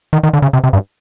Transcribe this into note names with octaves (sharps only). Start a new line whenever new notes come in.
D#3
D#3
D3
C#3
C3
C3
G2